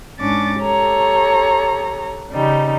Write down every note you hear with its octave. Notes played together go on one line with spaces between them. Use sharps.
G#2 C#4 D4 D6 A6
G4 A4 C#5 A#5
C#3 G3 D#4